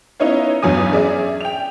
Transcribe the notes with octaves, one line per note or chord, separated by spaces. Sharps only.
B3 C#4 D#4 E4 C#5 F5
E2 G2 F#3 G#5 D#6
C#4 G#4 D5 E5
G5 F7